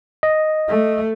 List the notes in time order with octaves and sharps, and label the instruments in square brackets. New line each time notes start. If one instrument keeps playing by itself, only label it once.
[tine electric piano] D#5
[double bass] A3